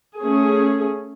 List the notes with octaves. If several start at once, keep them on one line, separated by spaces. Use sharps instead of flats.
A3 C#4 G#4